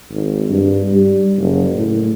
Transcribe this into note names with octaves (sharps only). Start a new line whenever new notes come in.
G#1
G2
G3
F#1
A2